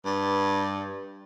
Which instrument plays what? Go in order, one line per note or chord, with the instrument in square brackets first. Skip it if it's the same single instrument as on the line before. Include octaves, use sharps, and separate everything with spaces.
[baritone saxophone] G2